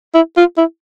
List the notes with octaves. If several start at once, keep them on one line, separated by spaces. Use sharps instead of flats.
E4
F4
E4